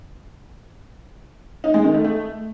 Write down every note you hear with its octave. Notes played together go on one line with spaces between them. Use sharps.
D#4
G#3
D#3
A3
A3